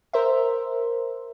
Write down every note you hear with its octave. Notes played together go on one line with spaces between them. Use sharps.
A#4 C5 E5